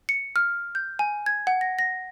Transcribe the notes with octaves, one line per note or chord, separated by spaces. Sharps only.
C#7
F6
G6
G#5
G#6
F#5
A#6
A#6